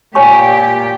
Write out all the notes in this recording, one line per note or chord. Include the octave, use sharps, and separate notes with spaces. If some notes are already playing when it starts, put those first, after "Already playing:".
A#2 G4 C#5 G#5 C#6